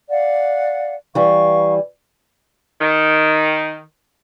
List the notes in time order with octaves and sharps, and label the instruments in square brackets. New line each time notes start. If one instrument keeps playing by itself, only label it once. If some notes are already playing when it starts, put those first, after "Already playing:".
[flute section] D5 F5 F#5
[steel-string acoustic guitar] E3 G3 [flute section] F5 C#6
[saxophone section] D#3